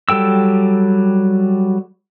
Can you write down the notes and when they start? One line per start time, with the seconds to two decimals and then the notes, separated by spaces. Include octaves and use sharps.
0.09 F#3 G3 A4 G5 E6